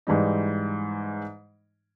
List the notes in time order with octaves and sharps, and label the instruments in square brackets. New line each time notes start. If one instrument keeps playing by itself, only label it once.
[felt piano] G#2 E3 G3 D#4